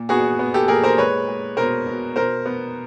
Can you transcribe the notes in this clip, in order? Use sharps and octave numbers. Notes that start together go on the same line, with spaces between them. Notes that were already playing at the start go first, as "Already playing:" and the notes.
Already playing: A#2
B3 F#4 G#4
B3
G4 A4
A#2 G#4 A#4
A#4 C5
G#3 B4 C#5
G#3
B2 A#4 C5
B2
B2 A#4 C5
B3